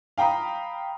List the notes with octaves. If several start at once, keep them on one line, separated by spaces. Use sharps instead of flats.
F5 G5 A#5 B5 D#6